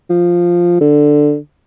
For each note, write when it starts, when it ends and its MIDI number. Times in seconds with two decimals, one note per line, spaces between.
0.10 0.80 53
0.81 1.37 50